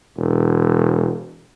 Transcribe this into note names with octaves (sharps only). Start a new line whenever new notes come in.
E1